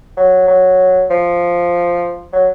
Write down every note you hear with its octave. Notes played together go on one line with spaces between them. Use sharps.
F#3
F#3
F3
F#3